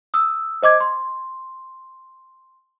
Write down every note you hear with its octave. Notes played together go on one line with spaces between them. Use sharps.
D#6 E6
C5 D#5 D6 G#6
C6